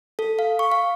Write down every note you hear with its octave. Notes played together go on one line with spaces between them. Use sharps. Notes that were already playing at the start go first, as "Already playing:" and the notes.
A4
F5
C#6
F5